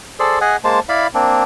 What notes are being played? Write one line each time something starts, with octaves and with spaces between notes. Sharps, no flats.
G#4 A4 C5 D5
G#4 D#5 F#5 G#5
G#3 A#3 C5 A5
E4 D5 F5 B5
A#3 C4 D4